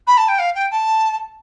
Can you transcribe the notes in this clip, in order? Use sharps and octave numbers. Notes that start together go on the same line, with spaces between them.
B5
A5
G5
F5
G5
A5